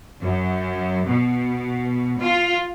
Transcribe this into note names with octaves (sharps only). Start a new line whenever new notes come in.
F#2
B2
F4